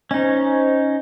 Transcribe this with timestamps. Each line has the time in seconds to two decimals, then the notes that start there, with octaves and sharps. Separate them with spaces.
0.11 C#4 D#4 C5 D#5